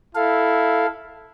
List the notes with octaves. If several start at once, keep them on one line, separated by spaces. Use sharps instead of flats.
E4 A4 F5